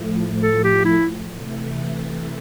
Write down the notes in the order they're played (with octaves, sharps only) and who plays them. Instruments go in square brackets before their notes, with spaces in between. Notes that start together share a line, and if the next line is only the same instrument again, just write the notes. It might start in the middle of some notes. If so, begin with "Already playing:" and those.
Already playing: [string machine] A2 F3 A3
[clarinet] A4
G4
E4
[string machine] C3 E3 A3